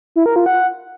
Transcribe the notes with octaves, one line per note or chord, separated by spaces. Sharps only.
E4
A#4
F4
F#5